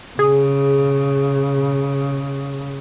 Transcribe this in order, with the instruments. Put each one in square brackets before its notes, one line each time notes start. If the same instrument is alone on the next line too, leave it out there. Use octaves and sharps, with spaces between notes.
[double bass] C#3 [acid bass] G#4